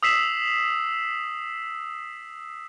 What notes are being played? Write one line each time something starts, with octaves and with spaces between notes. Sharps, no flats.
D#6 E6 B6 C7 E7 F#7